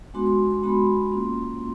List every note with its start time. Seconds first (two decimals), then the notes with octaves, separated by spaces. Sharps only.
0.14 G#3 B3 D4 F#4 C6
0.26 C6
0.51 C6
0.63 G#3 B3 D4 F#4 B5
1.12 A#3 C#4 F4 C6